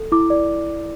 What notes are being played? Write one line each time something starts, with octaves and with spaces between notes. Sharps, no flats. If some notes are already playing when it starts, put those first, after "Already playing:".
Already playing: A4
E4 D6
D5